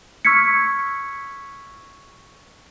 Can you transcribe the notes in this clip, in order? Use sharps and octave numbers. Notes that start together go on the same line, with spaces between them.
C#6 E6 F6 G#6 B6 C#7